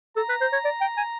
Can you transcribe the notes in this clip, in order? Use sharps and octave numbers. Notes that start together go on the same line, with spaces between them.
A4 A#5
B4
C5
C#5
D5
G5
G#5